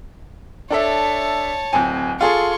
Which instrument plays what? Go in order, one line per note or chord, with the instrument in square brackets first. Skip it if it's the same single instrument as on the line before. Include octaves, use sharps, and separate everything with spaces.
[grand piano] D4 A4 E5 [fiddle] C#5 A5
[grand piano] D1 C4 G#5
[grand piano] F4 G#4 A4 [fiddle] C6 C#6